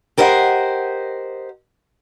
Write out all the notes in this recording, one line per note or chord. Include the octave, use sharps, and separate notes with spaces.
G4 A#4 C5 D#5 F#5